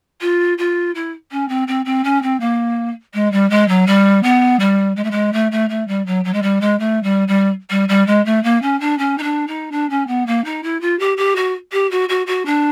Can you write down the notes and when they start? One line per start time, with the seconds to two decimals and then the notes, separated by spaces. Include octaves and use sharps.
0.21 F4
0.58 F4
0.95 E4
1.31 C#4
1.48 C4
1.67 C4
1.85 C4
2.04 C#4
2.22 C4
2.40 A#3
3.14 G#3
3.32 G3
3.50 G#3
3.68 F#3
3.87 G3
4.23 B3
4.59 G3
4.96 G#3
5.04 A3
5.11 G#3
5.33 A3
5.51 A3
5.69 A3
5.87 G3
6.06 F#3
6.24 F#3
6.33 G#3
6.42 G3
6.61 G#3
6.79 A3
7.03 G3
7.28 G3
7.70 G3
7.88 G3
8.07 G#3
8.25 A3
8.43 A#3
8.62 C#4
8.80 D4
8.98 C#4
9.18 D#4
9.23 D4
9.47 D#4
9.71 D4
9.89 C#4
10.07 B3
10.26 A#3
10.44 D#4
10.63 E4
10.81 F4
10.99 G4
11.17 G4
11.36 F#4
11.72 G4
11.90 F#4
12.09 F#4
12.26 F#4
12.45 D4